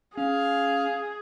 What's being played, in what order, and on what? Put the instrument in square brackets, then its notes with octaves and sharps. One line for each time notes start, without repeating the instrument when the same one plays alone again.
[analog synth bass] C#4 [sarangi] G#4 [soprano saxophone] F5